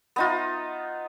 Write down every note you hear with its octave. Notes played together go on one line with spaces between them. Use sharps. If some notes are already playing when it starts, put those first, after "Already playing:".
B3 D#4 F4